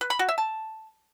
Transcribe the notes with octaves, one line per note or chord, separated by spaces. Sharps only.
B4
B5
F#4
E5
A5